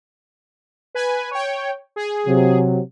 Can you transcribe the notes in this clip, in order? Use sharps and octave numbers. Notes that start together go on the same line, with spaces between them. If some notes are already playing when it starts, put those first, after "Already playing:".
B4 G#5
C#5 G5
G#4
C3 F#3